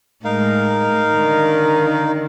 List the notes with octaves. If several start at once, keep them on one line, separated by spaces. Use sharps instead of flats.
A2 G#3 D#4 A#4 F5
D3 D#3